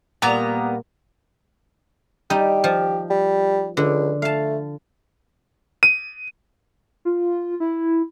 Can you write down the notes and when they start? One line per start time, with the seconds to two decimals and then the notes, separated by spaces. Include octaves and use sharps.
0.22 A#2 G3 A#3 B3 A#5
2.30 G3 D#4 G4
2.64 F3
3.10 G3
3.77 C#2 D3
4.22 A3 F5 A5
5.83 D#7
7.05 F4
7.60 E4